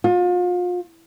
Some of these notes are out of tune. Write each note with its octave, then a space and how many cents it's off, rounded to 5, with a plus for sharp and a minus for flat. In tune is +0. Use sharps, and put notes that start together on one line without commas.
F4 +35